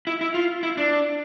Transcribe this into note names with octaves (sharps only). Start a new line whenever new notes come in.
E4
E4
F4
E4
D4